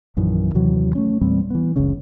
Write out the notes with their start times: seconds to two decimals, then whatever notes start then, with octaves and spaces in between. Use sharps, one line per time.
0.17 A#1 F#2 D#3 E3
0.54 D#2 C3 E3 F#3
0.95 A3 C#4
1.21 E2 A#2 G3 C4
1.50 E3 B3
1.76 F#1 C#2 C#3 C#4